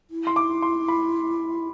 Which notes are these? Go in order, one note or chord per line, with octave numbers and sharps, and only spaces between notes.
E4
C6
D6
C6
B5